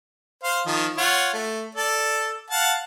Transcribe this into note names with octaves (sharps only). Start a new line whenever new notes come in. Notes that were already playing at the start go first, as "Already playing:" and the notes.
C5 F5
D#3 F3
F4 C#5 F#5
A3
A4 D5
F5 F#5 A5